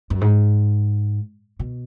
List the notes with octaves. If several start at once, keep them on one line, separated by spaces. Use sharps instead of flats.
F#2
G#2
B2